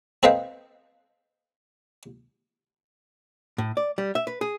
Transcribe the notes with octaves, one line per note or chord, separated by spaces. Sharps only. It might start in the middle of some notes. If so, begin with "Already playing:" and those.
C4 A4 B4 D#5 F5 G5
A2
D5
G3
E5
B4
G#4